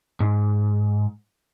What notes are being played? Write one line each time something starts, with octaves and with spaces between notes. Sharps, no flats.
G#2